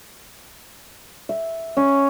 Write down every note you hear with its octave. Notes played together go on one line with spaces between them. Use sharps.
E5
C#4